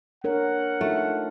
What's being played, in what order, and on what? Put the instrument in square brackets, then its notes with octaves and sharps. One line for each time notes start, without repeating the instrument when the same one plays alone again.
[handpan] D4 A#4 C#5 [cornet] F#5
[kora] A3 [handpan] D#4 F4